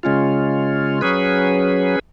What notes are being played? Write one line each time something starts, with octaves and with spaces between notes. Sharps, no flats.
C#3 G#3 C#4 F4
F#3 C#4 G#4 B4